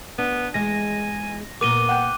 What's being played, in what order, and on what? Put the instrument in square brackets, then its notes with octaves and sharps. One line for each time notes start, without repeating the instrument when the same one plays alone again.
[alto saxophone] B3 [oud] D4
[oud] E2 G#3 [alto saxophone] G#5 [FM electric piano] A#6
[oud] A#2 A#4 [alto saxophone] B3 [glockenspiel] D6 D#7 G7
[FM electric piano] F#5 G5